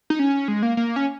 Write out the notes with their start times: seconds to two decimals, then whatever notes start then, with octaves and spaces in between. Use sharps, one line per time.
0.10 D#4
0.19 C#4
0.48 G#3
0.62 A#3
0.77 A#3
0.96 C#4